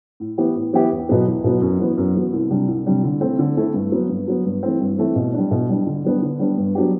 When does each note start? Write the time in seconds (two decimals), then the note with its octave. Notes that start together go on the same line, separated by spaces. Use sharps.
0.20 A2
0.37 E3 B3 E4 G4
0.55 A2
0.73 E3 B3 E4 G4
0.91 E2
1.09 B2 F#3 B3
1.27 E2
1.44 B2 F#3 B3
1.61 F#2
1.79 E3 B3 F#4
1.97 F#2
2.15 E3 B3 F#4
2.33 C2
2.50 C3 G3 D4
2.68 C2
2.86 C3 G3 D4
3.03 D3
3.21 A3 C4 E4
3.39 D3
3.57 A3 C4 E4
3.74 G2
3.92 F#3 B3
4.09 G2
4.27 F#3 B3
4.45 G2
4.63 E3 A3 C4
4.81 G2
4.98 E3 A3 C4
5.16 B2
5.34 G3 D4
5.51 B2
5.69 G3 D4
5.86 D3
6.04 G3 B3 D4
6.22 D3
6.39 G3 B3 D4
6.58 G2
6.75 F#3 B3 D4 G4